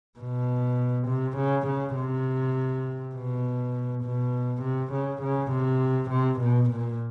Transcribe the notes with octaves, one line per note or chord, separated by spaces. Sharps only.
B2
C3
C#3
C#3
C3
B2
B2
C3
C#3
C#3
C3
C3
B2
A#2